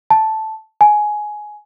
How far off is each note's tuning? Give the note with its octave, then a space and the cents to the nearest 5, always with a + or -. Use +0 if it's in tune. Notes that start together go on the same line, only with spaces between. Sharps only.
A5 -5
G#5 +15